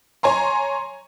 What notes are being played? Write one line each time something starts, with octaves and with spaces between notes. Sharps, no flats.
C#5 G#5 A#5 C6